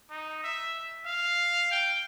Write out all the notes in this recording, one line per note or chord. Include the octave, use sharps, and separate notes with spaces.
D#4
E5
F5
G5